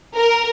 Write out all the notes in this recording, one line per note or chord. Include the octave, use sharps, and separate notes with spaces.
A#4